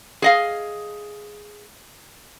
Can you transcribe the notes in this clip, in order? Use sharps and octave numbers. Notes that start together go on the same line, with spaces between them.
G#4 D#5 F5